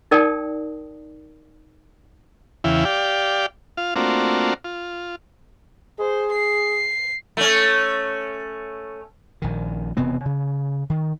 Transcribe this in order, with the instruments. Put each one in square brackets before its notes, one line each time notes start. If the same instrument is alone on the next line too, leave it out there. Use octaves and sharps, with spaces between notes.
[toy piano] D#4 A#4 D5 G5 A5 D#6
[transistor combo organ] E2 C#3 E3 E4 F5 G5
G4 D5 F5 G5
F4 F5
A3 A#3 C4 D4 F4 F#4
F4
[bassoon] G#4 [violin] C5
[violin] C7
[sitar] A3 C#4
[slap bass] A#1 D#3
E1 C3 B3 C4
C#3
D#3